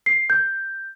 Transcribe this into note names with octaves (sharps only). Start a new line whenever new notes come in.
C7
G6